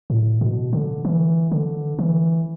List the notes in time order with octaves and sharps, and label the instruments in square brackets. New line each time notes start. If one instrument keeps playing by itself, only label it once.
[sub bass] A2
B2
D3
E3
D3
E3